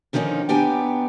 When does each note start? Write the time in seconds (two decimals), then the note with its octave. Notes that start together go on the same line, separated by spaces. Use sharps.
0.13 D3 D#3 F3 C4 C#4 D#4
0.49 B3 D4 G4 G5 G#5 A#5